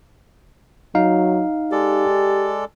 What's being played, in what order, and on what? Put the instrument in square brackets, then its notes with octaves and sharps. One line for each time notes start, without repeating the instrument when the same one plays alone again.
[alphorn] F#3 [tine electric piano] D#4 F5
[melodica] G#3 A4 D5 [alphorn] G4